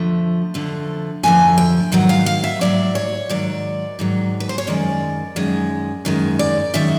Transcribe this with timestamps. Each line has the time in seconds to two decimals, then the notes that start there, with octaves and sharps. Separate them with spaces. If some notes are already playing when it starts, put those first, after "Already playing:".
Already playing: F2 D3 F3 A3
0.54 F2 D3 F3 A3
1.23 F2 D3 F3 A3 G#5
1.58 G5
1.92 G#2 D#3 F#3 F#5
2.09 F5
2.26 F5
2.44 E5
2.61 G#2 D#3 F#3 D5
2.95 C#5
3.30 G#2 D#3 F#3 D5
3.99 G#2 D#3 F#3
4.40 B4
4.49 C5
4.58 C#5
4.67 F#2 D#3 G#3 D5
5.36 F#2 D#3 G#3
6.05 F#2 D#3 G#3
6.39 D5
6.74 F#2 D#3 G#3 E5